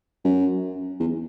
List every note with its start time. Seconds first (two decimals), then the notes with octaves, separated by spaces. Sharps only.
0.24 F#2
1.00 E2